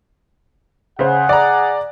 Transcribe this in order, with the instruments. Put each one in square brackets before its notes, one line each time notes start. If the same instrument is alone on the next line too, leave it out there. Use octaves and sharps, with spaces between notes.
[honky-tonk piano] C#3 C5 [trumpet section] G#4 F#5
[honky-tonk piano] D5 A#5